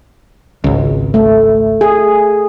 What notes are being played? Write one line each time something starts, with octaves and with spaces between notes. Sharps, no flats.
G#1 C#2
A3
G#4